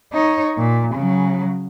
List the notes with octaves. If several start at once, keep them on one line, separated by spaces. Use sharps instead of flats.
D#4 C#5
A#2
C#3 F#3